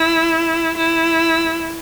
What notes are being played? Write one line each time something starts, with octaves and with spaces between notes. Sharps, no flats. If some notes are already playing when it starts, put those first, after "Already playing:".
Already playing: E4
E4